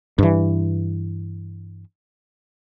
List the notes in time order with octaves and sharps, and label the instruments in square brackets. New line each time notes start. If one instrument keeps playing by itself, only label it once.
[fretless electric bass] G2 E3